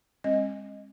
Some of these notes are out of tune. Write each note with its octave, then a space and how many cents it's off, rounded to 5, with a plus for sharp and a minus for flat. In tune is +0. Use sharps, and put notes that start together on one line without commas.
G#3 -30 C4 +45 D#5 +0